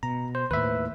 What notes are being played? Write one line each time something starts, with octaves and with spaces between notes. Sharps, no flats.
B2 A#5
C5
D#2 A2 B4 E5